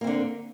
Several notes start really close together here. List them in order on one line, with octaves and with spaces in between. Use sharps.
A#3 C4 D3